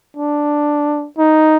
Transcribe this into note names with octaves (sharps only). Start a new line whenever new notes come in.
D4
D#4